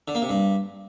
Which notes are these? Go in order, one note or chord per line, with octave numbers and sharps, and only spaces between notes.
D3
A#3
C3
G2